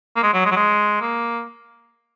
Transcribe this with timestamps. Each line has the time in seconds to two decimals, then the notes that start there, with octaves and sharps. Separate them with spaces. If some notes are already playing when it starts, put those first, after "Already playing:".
0.16 A#3
0.23 G#3
0.34 F#3
0.45 G#3
0.51 F#3
0.56 G#3
1.01 A#3